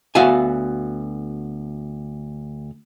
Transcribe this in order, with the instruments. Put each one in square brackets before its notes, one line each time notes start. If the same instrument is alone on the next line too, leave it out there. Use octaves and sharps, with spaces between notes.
[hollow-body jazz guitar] D2 B3 F#4 E5 F5 G#5